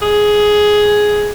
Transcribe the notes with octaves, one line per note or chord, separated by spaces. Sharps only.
G#4